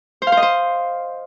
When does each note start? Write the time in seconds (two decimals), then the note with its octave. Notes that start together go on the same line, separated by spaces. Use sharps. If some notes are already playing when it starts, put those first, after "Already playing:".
0.22 C5
0.27 F5
0.32 C5
0.37 D#5
0.42 C5